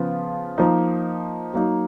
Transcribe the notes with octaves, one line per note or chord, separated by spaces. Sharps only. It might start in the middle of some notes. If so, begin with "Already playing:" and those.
Already playing: C#3 F3 B3 F4
F3 A#3 D#4
F#3 A#3 D#4